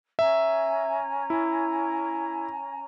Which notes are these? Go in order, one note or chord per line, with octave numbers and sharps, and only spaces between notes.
C#4 E5 G#5 A#5
E4